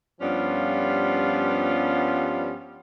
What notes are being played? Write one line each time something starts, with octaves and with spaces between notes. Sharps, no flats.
G2 F3 G3 B3 C#4 F4